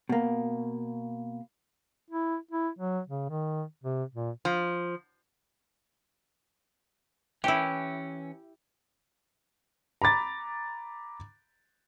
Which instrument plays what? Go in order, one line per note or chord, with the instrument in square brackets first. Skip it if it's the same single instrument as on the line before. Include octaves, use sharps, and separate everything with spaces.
[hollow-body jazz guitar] B2 A#3
[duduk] E4
E4
F#3
C#3
D#3
C3
A#2
[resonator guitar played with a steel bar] F3
[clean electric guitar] E3 C#4 [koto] E4 G4
[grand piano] A#5 B5 D6 A6